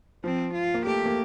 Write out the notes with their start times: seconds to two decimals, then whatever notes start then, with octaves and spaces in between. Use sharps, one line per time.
0.24 F3 C4
0.55 F4
0.74 A#3
0.86 A3 G4
1.06 A#3